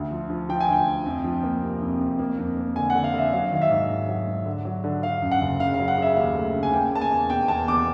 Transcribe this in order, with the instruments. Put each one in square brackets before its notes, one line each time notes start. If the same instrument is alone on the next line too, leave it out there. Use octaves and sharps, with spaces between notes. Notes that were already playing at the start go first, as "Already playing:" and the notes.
Already playing: [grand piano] D2
F3
F3
F3 G5
G#5
D2 G5
D2
F2
F3
A#3
C3
F2
F2
A#3
F2
A#3
D3 G#5
F#5
D3
F5
D3 E5
F#3 F5
D#3 F5
E5
G#2
G#2
F#3
G#2
D3
F#3
D3
D3 F5
F#2
F#5
F#1
C#3 F5
F5
F#3
F#5
C#3 E5
D#2 F5
A3
C#3
G#5
A#3 G5
A#3 A5
G#5
E2
B2 G5
E2 A5
E2 D6